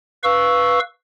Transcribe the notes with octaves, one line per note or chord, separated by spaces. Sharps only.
B4 F5 C#6 E6